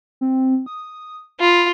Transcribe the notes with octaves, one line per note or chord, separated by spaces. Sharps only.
C4
D#6
F4 B5